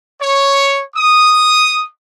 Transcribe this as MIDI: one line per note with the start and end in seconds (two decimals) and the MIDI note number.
0.20 0.83 73
0.96 1.87 87